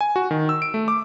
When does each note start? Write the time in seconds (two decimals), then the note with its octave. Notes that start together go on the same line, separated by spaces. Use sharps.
0.01 G#5
0.16 F#4
0.31 D#3
0.49 E6
0.62 D7
0.74 A3
0.88 D6